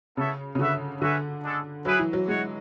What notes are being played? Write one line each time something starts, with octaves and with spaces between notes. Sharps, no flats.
C#3 B3 E4 A4 C#5 E5
C#3
D3 F#4 B4 E5
D3 C#4 F#4 B4 E5
G#3 D4 A4
F#3 E4 G#4 B4
E3
F#3
G#3 F#4 C#5